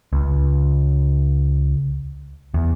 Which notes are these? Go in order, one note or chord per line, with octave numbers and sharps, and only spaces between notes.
C#2
E2